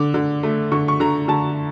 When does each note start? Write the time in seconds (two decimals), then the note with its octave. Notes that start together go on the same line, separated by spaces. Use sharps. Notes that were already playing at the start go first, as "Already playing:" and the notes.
Already playing: D3 D6
0.14 D3
0.43 A3
0.72 D3 C#6
0.88 C#6
1.00 D3 A#5
1.28 D3 A5